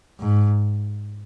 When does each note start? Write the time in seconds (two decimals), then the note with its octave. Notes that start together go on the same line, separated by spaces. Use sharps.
0.20 G#2